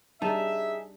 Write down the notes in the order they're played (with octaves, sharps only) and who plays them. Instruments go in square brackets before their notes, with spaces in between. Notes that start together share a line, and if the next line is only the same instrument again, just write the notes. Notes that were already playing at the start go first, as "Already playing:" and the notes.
[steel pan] G3 A5 [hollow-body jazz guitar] D#4 [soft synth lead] G#4 [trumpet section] E5